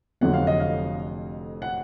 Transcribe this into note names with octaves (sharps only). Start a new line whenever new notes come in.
F1 F2 D3 F#3 F#5
F5
D#5
F5
F#5